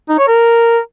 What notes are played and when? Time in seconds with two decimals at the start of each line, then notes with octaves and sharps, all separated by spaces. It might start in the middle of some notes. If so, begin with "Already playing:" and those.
0.09 D#4
0.19 C#5
0.28 A#4